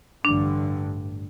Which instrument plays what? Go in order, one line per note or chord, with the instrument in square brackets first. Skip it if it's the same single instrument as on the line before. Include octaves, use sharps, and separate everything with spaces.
[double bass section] A1 G2 D3 [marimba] D4